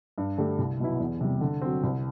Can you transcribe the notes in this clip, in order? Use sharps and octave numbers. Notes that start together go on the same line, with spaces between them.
G2
D3 A3 D4 G4
C2
B2 F#3 B3 E4
E2
C3 G3
D3
F#3 C4
C2